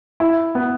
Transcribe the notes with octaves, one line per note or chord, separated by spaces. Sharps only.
E4
B3